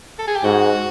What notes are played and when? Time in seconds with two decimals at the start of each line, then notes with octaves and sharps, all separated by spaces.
0.19 A4
0.27 G#4
0.36 G4
0.44 G#2 F#4